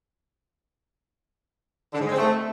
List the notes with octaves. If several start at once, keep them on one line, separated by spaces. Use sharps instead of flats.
D3
G#2
G#3
C4
A3